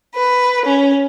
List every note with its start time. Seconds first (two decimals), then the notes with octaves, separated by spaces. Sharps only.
0.14 B4
0.65 C#4